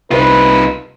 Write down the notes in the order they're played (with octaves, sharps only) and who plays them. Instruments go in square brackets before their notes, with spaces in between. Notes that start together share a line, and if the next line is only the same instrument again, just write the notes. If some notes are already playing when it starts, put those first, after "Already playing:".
[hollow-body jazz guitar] C2 C5 [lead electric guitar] D#4 F4 [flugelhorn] B4